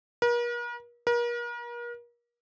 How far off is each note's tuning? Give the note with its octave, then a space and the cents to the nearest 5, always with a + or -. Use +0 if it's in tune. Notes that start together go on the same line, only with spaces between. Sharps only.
A#4 +45
A#4 +40